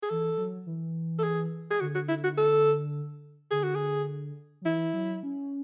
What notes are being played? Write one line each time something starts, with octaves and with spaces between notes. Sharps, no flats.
G#4
E3 A4
F#3
E3
A4
G#4
G#4
D3 F#4
F#4
E4
F#4
A4
D3 G#4
F#4
G#4
F#3
E3 E4
F#3
C#4